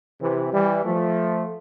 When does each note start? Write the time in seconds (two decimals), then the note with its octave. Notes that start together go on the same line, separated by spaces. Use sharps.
0.21 C3 E3
0.52 E3 G3
0.85 F3 A3